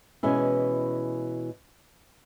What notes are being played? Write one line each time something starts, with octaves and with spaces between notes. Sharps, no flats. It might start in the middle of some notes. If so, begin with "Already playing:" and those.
B2 E3 G#3 C#4 E4